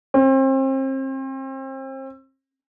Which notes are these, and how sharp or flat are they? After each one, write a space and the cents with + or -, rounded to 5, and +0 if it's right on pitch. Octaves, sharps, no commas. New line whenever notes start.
C4 +35